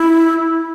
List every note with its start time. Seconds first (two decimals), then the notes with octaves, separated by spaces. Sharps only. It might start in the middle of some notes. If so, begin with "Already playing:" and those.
Already playing: E4